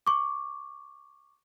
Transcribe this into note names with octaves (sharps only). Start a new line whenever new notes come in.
C#6 D6